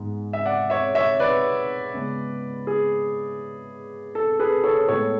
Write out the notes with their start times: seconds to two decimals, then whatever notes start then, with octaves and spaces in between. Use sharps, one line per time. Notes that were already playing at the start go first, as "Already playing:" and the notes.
Already playing: G#2 G#3 B3
0.33 E5
0.45 D5 F#5
0.70 C#5 E5
0.95 C#5 E5
1.19 B4 D5
1.93 C#3 G#3 B3
2.67 G#4
4.15 A4
4.39 G#4 B4
4.64 A4 C#5
4.88 A2 G#3 B3 A4 C#5